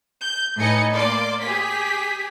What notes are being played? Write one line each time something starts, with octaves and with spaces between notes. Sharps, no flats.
G6
A2 D#4 B4 D#5 G#5 C#7
A#3 D5 C6 D6
G4 G#4 B6